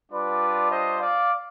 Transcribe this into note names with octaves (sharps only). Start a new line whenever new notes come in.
G3 D4 F4 B4 D5
C5 D#5
D5 F5